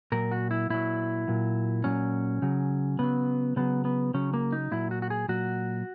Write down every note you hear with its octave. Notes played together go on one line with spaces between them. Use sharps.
A#2 F#3 A#4
F#4
E4
A#2 F#3 E4
A#2 F#3
A#2 F#3 C#4
C#3 F#3
C#3 F#3 B3
C#3 F#3 B3
B3
C#3 F#3 C#4
A#3
D#4
A#2 F#3 E4
F#4
F#4
G#4
A#2 F#3 F#4